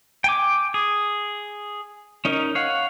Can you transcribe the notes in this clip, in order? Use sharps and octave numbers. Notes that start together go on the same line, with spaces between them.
G5 G#5 D6
G#4
C#4 D#4 A#4
C#5 F5 F#5